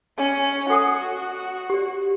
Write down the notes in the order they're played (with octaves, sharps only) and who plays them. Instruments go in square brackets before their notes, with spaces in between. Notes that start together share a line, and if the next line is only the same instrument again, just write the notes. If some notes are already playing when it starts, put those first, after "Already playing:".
[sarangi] C#4
[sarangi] F#4 [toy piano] A4 F#5 D#6
[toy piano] G4 D5